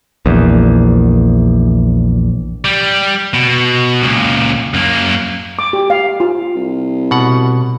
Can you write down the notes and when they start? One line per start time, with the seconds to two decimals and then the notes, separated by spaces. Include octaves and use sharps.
0.26 A#1 E2
2.65 G3
3.34 B2
4.02 C#2 A#2
4.74 F#2 A#3
5.59 D6
5.73 G4
5.90 F5
6.20 F4
6.55 C2
7.11 B2 F#5